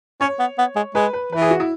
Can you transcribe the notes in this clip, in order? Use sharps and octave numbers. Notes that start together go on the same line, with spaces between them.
C#4 C#5
B3
B3
G#3
G#3 B4
B4
E3 B4
G#4
F#4
E4